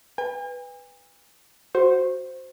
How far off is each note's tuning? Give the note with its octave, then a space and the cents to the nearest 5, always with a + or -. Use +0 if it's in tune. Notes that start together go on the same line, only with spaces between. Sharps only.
B4 +0 G#5 -45
F#4 +0 C5 +0 C#6 -30